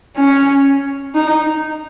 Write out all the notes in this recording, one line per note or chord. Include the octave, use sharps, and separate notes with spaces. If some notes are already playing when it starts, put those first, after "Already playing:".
C#4
D#4